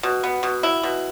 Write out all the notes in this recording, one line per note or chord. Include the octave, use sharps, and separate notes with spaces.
B2
B3
B2
E4
B2